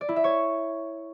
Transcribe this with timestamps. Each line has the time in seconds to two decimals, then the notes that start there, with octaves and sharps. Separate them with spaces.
0.01 D5
0.09 E4
0.16 E5
0.24 C#5